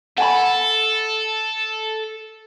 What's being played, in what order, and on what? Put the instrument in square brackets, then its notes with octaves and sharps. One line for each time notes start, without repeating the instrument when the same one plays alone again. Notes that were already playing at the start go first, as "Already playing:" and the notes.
[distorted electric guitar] A4 [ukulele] F#5 G#5 B5